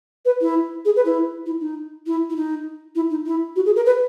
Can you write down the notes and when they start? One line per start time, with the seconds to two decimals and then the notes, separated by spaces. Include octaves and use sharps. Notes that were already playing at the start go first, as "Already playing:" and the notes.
0.25 B4
0.41 E4
0.85 G#4
0.96 B4
1.05 E4
1.46 E4
1.61 D#4
2.06 E4
2.30 E4
2.36 D#4
2.95 E4
3.10 D#4
3.26 E4
3.56 F#4
3.66 G#4
3.76 A#4
3.86 B4